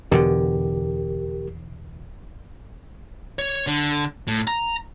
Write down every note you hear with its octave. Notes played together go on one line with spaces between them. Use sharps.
E2 B2 D3 G4 A#4
C#5
D3
A2
A#5